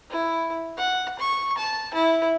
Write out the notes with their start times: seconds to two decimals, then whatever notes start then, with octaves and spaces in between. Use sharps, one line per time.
0.10 E4
0.77 F#5
1.19 C#6
1.58 A5
1.94 E4